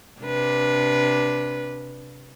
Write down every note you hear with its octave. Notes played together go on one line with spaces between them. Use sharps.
C3 D4 B4